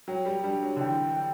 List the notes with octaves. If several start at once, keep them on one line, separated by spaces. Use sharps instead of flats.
F#3 G5
G3
G3 D4
F#3
D3
E3 G5
G5